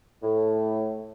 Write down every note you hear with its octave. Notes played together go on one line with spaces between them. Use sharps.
A2